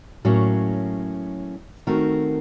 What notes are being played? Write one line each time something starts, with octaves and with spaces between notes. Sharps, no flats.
A2 F#3 A#3 C#4
D#3 A3 C4 F#4 A#4